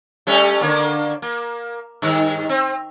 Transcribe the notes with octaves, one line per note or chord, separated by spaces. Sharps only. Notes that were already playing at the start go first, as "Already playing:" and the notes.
G3 A3 C#4
D3 A#3
A#3
G2 D#3
C4